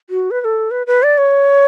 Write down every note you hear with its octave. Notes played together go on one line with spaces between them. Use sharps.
F#4
B4
B4
A4
B4
B4
D5
C#5